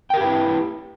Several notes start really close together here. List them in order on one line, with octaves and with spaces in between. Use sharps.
G5 A#4 G4 B4 E4